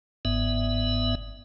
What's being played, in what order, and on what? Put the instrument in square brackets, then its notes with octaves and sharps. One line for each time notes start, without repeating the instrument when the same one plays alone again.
[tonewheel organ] G1 G#2 B3 E5